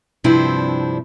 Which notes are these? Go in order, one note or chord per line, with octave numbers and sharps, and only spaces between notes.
G2 C3 F3 C4 D4 E4